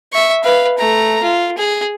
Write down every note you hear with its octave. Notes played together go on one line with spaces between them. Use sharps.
E5 C#6
B4 F5
A3 A#5
F4
G#4